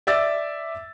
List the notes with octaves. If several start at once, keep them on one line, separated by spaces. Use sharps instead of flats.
D5 E5 D6 E6 A6